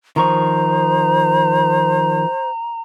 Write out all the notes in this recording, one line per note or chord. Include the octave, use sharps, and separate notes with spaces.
D#3 F3 C5 A#5 C#6